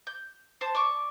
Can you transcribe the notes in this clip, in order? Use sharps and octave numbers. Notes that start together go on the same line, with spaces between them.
G6
C5 A5
D5 C#6